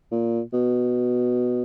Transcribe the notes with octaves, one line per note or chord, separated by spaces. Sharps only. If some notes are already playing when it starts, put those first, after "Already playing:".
A#2
B2